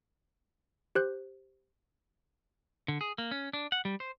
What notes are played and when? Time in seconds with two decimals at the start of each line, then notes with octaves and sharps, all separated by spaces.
0.95 G4 C5 F#6 G6
2.88 D3
3.01 G#4
3.18 A#3
3.31 C#4
3.53 D4
3.72 F#5
3.85 G3
4.00 C5